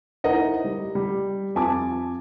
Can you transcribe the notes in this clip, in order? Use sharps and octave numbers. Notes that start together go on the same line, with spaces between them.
D#4 E4 A#4 C5 D#5 F#5
G3
G3
F2 F4 G#5 A5 D6